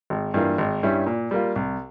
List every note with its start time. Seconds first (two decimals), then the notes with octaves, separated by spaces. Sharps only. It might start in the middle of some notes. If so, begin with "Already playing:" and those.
0.10 G#1
0.34 G2 E3 A#3 F4
0.58 G#1
0.83 G2 G3 C#4 E4
1.07 A#2
1.31 G3 A#3 F4
1.56 C2